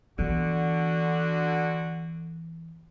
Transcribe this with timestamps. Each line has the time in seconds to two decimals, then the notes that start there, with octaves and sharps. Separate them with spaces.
0.19 D3 E3 B3 F#4